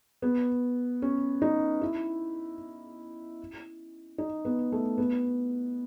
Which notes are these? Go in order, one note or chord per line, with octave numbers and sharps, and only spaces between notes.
B3
C#4
D#4
E4
D#4
B3
A3
B3